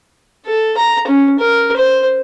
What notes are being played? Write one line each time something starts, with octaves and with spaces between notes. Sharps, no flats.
A4
A#5
C#4
A#4
C5